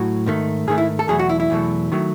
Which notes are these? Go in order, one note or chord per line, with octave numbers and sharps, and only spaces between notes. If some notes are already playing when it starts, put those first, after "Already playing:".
Already playing: A2 F#3 F#4
G#2 D#3 A3
G#2 D#3 A3 G#4
E4
A4
E2 B2 F#3 A3 G#4
F#4
E4
E4
E2 B2 F#3 A3
D#3 F#3 A3